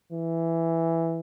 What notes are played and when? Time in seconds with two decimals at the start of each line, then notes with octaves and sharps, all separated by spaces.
0.12 E3